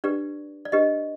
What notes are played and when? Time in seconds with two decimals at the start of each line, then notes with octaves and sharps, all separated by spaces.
0.04 D4 G4 B4 D5
0.65 D5
0.72 D4 G4 B4 D#5